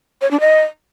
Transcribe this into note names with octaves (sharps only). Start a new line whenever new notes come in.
C#5
D4
D#5